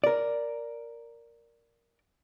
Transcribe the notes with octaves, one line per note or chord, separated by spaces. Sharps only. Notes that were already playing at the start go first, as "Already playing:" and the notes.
A#4 D5